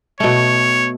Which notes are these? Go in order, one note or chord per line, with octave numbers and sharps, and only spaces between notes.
B2 A3 C#5